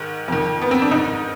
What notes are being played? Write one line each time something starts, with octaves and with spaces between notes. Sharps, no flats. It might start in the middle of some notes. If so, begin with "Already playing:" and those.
Already playing: G#2 D#3
F2 D#3
B3
C4
D4
G#2 D#3 D#4